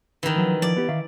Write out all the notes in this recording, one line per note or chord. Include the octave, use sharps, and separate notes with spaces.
D#3 E3
F3 F#3
F3 D5
B3 G4
D#3 E5 F5